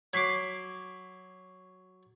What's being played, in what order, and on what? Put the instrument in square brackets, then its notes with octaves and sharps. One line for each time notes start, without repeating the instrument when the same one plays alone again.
[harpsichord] F#3 D6 [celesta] G#6 B6 C7